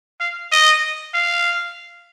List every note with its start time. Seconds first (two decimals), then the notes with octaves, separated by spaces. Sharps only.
0.20 F5
0.52 D#5
1.14 F5